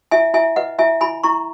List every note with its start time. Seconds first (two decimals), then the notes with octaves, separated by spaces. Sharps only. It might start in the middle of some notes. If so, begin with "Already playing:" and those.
0.11 E4 E5 G#5
0.34 E4 E5 G#5
0.56 B4 D#5 F#5
0.79 E4 E5 G#5
1.01 E4 G#5 B5
1.24 E4 A#5 C#6